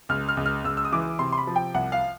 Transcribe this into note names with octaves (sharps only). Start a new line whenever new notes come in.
C#2 F6
F6
C#2
F6
C#2 E6
E6
D#6
E3 D6
C3 C6
C6
B5
F3
G5
C2 F#5
F5